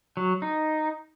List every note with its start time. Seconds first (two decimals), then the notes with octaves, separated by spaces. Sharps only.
0.17 F#3
0.42 D#4